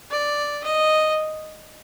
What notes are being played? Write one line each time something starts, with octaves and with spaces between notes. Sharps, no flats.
D5
D#5